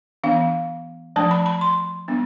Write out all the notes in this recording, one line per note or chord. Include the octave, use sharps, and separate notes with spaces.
E3 B3 D4 F5
F3 A3 D4 A5
B5
B5
C6
G3 B3 D4